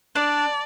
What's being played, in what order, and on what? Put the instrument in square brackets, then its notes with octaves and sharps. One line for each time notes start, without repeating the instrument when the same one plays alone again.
[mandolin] D4 [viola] D5